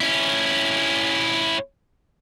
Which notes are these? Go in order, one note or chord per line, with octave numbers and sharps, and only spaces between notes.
C#4 E4